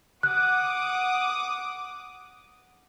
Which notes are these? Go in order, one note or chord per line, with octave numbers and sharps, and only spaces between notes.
F#5 D6 D#6 F#6